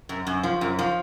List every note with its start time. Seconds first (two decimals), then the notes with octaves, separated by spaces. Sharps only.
0.09 F#2
0.27 F#2
0.43 F3
0.61 F#2
0.79 F3